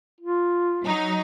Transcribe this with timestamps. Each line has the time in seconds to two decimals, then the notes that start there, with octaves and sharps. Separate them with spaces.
0.20 F4
0.83 F#3 D#4